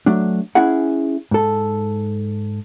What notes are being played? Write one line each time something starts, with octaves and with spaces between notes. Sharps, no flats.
F#3 A3 D4
C#4 E4 G#4 F#5
G#2 A4